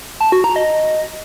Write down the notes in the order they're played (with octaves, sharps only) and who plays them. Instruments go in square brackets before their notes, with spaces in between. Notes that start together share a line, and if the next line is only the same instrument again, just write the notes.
[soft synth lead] A5
F#4
A#5
D#5